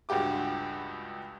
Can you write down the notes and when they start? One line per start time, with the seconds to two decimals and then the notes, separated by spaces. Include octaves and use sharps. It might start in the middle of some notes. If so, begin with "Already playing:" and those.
0.09 C#2 G2 F#4 G4 D6